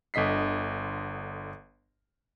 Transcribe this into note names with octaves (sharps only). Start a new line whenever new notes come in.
G1 D3 D#5 B6 C7